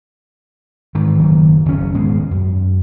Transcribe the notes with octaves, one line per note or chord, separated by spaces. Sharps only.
G#2 D#3 E3
F#1 D#3 F#3 A#3
F#1 B2 C#4
D#1 G#2 G#3 B3
F#2